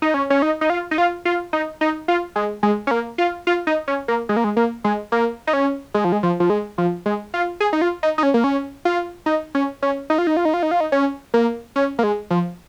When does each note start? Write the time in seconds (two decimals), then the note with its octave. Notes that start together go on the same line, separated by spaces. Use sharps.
0.02 D#4
0.14 C#4
0.30 C#4
0.42 D#4
0.61 D#4
0.70 F4
0.91 D#4
0.98 F4
1.25 F4
1.53 D#4
1.81 D#4
2.08 F4
2.36 G#3
2.63 G#3
2.87 C#4
2.91 A#3
3.18 F4
3.47 F4
3.67 D#4
3.88 C#4
4.08 A#3
4.29 G#3
4.36 A#3
4.44 G#3
4.57 A#3
4.84 G#3
5.12 A#3
5.47 D#4
5.53 C#4
5.94 G#3
6.04 F3
6.12 G#3
6.23 F3
6.40 F3
6.50 G#3
6.78 F3
7.06 G#3
7.34 F4
7.60 G#4
7.73 D#4
7.81 F4
8.03 D#4
8.18 D#4
8.23 C#4
8.34 A#3
8.44 C#4
8.85 F4
9.26 D#4
9.55 C#4
9.82 C#4
10.10 D#4
10.18 F4
10.27 D#4
10.37 F4
10.45 D#4
10.54 F4
10.63 D#4
10.71 F4
10.80 D#4
10.92 C#4
11.34 A#3
11.76 C#4
11.99 A#3
12.03 G#3
12.30 F3